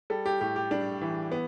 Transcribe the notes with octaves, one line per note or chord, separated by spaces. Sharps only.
G3 A4
G4
A2 G4
G4
G3 D4
E3
B3